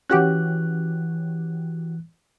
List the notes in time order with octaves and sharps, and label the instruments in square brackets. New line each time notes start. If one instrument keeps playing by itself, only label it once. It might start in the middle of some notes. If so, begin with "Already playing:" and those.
[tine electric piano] E3 F#6 [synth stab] C#4 F#4 G4